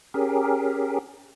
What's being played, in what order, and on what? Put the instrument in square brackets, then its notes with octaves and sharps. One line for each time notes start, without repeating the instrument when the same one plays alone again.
[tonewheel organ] C#4 G4 G#4 A#4